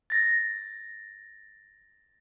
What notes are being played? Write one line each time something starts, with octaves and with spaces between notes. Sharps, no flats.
A6 A#6